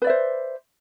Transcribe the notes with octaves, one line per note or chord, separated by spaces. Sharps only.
B4 C5 D5 E5